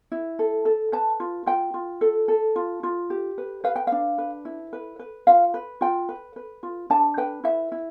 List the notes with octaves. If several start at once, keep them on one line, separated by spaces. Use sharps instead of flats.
E4
A4
A4
B4 A5
F4
F4 G5
F4
A4
A4
F4
F4
G4
B4
B4 F5
G5
D4 F5
B4
E4
B4
B4
F4 F5
B4
F4 G5
B4
B4
F4
D4 A5
B4 G5
E4 E5
E4